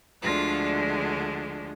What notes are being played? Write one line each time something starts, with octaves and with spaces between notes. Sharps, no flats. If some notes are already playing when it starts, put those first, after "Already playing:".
D2 D3 F3 G#3 F4